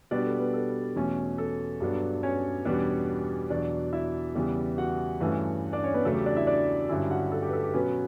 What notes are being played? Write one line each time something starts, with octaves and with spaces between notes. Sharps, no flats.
B2 G3 B3 D4 D5
A4
B3 B4
A4
E2 B2 A3 C#4
A4
G2 F#3 B3 D4
C#4 C#5
E2 B2 G3 B3 D4
E2 B2 F#3 D4 D5
E4 E5
E2 C#3 E3 G3 B3
F#4 F#5
G2 E3 A3 C#4
D4 D5
C#4 C#5
B3 B4
E2 C#3 F#3 A3 A4
G4
D4 D5
E4 E5
D4 D5
G2 D3 F#3 C#4 E4 E5
F#4 F#5
A4
G4
B4
A4
G4
B2 F#3 B3 C#4 B4